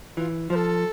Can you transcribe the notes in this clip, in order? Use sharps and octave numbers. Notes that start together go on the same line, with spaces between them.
E3 F4
F3 C5
A4